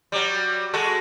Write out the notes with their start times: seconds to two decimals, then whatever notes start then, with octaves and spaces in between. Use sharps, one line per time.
0.12 F#3 G3
0.73 G#3 F#4 A4